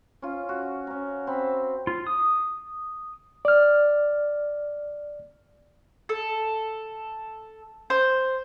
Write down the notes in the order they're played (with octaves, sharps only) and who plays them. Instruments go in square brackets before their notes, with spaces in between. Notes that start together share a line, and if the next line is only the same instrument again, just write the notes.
[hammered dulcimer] C#4 F4
F#4
C#4 A#5
C4 B5
[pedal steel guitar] F4
D#6
[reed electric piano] D5 F6
[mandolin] A4
C5